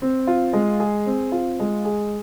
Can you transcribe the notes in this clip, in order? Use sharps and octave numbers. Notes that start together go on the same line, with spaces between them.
C4
F4
G#3
G#4
C4
F4
G#3
G#4